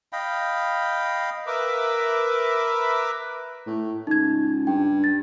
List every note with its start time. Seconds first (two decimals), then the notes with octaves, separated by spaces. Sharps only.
0.13 D#5 F5 G5 B5
1.47 A#4 B4 E5 B5 D6
3.66 A2
4.07 C#2 D#4 G#6
4.67 G2 G5
5.04 A6